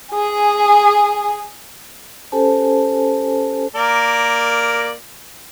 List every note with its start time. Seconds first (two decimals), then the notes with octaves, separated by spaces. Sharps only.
0.15 G#4 G#5
2.32 C#4 G4 A4 C5 G#5 A5
3.76 A#3 A#4 D5